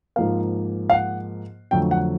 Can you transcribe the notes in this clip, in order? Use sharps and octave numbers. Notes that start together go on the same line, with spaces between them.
G#2 F3 A#3 F5
F5
F#5
F2 D3 F#3 A3 G5
F#5